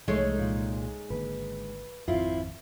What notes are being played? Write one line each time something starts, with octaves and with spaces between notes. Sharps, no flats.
C2 E3 F3 G#3 A3 D#4 C#5
A#2
G#1 D3 A#3 B4
G#1 F2 C4 E4 F4